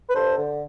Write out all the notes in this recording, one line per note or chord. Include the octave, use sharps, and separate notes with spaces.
B4
G2 A4 C5
D3